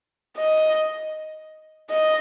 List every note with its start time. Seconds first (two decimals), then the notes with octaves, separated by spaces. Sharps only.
0.37 D#5
1.91 D#5